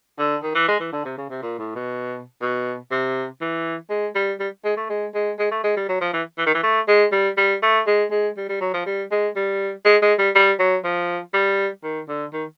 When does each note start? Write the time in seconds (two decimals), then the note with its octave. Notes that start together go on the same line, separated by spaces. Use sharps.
0.18 D3
0.43 D#3
0.55 E3
0.68 G#3
0.80 E3
0.92 D3
1.05 C3
1.17 C#3
1.30 C3
1.42 A#2
1.59 A2
1.75 B2
2.41 B2
2.91 C3
3.41 E3
3.90 G#3
4.15 G3
4.40 G3
4.64 G#3
4.77 A3
4.89 G#3
5.14 G#3
5.39 G#3
5.51 A3
5.63 G#3
5.76 G3
5.88 F#3
6.01 F3
6.13 E3
6.38 E3
6.46 D#3
6.54 E3
6.63 A3
6.88 G#3
7.12 G3
7.37 G3
7.62 A3
7.87 G#3
8.11 G#3
8.37 G3
8.49 G3
8.61 F#3
8.74 F3
8.86 G3
9.11 G#3
9.36 G3
9.85 G#3
10.02 G#3
10.18 G3
10.35 G3
10.59 F#3
10.84 F3
11.34 G3
11.83 D#3
12.08 D3
12.33 D#3